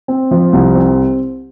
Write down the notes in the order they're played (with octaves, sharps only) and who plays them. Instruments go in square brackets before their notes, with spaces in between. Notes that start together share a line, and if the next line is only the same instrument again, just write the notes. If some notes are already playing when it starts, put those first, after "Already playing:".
[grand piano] C4
F3
C2
C4